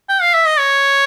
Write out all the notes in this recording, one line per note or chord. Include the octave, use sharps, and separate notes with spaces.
G5
F5
E5
D#5
C#5